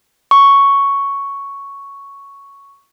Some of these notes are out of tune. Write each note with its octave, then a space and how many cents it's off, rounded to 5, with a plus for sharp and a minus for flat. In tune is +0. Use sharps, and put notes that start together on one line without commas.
C#6 +5